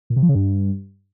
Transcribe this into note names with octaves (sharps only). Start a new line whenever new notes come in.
A#2
C3
F3
C#3
G2